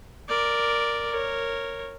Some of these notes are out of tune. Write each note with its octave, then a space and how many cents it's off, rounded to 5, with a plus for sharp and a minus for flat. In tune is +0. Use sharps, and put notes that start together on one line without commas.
A#4 +0 D5 +0
A#4 -10 C#5 -10